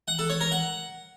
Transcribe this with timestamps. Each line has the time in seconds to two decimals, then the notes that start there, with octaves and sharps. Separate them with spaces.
0.08 F#5
0.19 A4
0.30 C#5
0.41 A#4
0.52 F#5